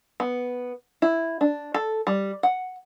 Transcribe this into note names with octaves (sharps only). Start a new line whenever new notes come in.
B3
E4
D4
A4
G3
F#5